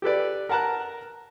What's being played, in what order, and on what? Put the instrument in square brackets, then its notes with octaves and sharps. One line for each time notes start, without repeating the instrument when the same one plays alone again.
[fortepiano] G4 A4 B4 D5
A#4 F#5 A5 A#5 F#6